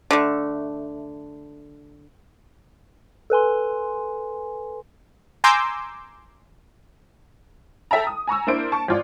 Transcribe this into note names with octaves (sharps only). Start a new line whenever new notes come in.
D3 A3
A4 B4 G#5 C6
G#5 A#5 C6 D6 E6 G6
A4 E5 G5 A5 A#5
D#6
G#5 A#5 C#6 E6
A#3 D4 E4 C5 D7
A5 C#6
G#1 F4 D5